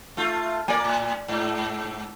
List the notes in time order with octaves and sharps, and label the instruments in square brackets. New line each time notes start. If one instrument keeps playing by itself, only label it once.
[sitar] A3 F4
[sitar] A#3 [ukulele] D5 G#5
[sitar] A2
G#2